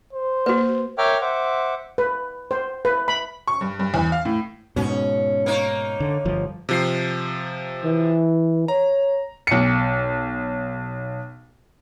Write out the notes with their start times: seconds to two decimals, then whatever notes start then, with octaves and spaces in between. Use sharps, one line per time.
0.13 C5
0.46 A#3 F#4 B4
0.98 A#4 C#5 E5 G5 D6 F6
1.21 C5 E5 F#5 D6
1.98 B4
2.51 C5
2.85 B4
3.08 B5
3.47 C#6
3.61 G2
3.79 G2
3.94 E2
4.12 F5
4.25 A2
4.76 G#2 B2 C#4
5.46 A#3 D#4 C#5
6.00 D3
6.25 G1 F3
6.69 C3 F3 C7
7.84 E3
8.68 C#5 A#5
9.47 B1 C#7